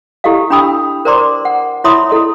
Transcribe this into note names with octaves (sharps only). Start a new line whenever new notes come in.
E4 G4 A4 D#5 F5
D4 G5 B5 D#6 E6
A#4 C5 D5 A#5 C6 D6
F#5
E4 C#5 E5 B5 C6 D#6
E4 A4 D#5 C6